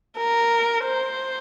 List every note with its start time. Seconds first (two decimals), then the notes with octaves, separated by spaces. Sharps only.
0.17 A#4
0.84 C5